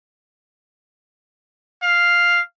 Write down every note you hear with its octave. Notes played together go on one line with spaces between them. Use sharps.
F5